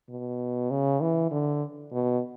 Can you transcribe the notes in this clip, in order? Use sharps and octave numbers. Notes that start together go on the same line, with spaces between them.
B2
C#3
E3
D3
B2